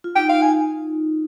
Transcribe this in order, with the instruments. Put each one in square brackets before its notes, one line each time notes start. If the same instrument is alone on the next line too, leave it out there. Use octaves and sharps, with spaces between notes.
[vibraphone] F4
[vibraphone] D#4 [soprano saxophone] G5
[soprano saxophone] F5
G#5